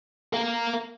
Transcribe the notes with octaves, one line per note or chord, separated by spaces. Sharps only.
A#4 F5